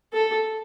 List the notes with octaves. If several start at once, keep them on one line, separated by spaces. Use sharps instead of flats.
A4